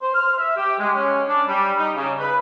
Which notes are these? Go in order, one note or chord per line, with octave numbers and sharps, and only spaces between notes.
C5
F6
E5
G4
G#3
C#4
D4
G3
D#4
C#3
B4